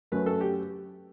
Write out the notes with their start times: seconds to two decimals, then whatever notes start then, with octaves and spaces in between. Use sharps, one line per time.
0.12 F#2 F#3 A3 B4
0.26 A4
0.41 G4